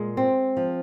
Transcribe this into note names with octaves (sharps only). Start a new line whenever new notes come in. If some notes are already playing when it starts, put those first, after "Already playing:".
Already playing: A#2 G#3
C4
F3